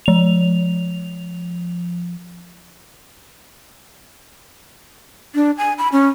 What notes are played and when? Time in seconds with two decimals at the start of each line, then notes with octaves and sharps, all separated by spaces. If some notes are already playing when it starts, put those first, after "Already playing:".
0.06 F3 F7
5.35 D4
5.58 G#5
5.78 B5
5.92 C#4